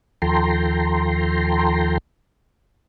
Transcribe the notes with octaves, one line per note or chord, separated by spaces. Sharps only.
D#2 F3 A4 G5 A#5 C6